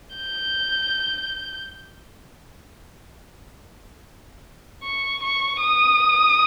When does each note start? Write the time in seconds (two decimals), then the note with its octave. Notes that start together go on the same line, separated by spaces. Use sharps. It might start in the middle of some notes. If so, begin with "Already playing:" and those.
0.16 G6
4.84 C#6
5.23 C#6
5.61 D#6